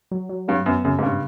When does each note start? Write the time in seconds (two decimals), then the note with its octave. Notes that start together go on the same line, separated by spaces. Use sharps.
0.11 F#3
0.29 F#3
0.48 G2 F#3
0.66 F#2 B3
0.85 F#2 C#3
0.99 G#2
1.03 G2 C#3